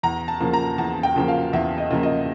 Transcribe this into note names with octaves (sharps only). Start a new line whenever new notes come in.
E2 A#5
A5
C#3 F3 A#3
A#5
E2 A5
G5
C#3 F3 A#3
F5
E2 E5
D#5
C#3 F3 A#3
D#5